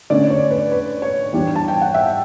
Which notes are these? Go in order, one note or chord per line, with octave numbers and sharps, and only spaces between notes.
D3 A3 C#4 D5
C#5
B4
B4
C#5
E3 G3 D4
A5
G5
F#5
E5